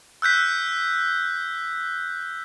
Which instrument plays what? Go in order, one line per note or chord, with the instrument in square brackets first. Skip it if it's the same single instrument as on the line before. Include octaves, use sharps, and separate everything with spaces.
[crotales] E6 F#6 G6 B6